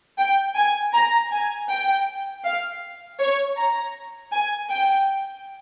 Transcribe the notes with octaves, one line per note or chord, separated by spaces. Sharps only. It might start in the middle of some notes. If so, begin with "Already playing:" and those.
G5
G#5
A#5
G#5
G5
F5
C#5
A#5
G#5
G5